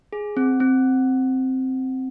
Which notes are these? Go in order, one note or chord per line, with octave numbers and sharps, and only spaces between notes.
G#4
C4
C4